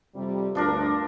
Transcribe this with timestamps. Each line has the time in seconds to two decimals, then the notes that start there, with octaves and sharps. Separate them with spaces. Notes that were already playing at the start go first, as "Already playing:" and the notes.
0.15 F2 C3 G3
0.55 D2 G2 F3 D4 A#4